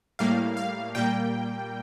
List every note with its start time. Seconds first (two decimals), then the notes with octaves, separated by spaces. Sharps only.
0.19 A2 G3 A#3 F5
0.57 F5
0.95 A#2 G3 A#3 G5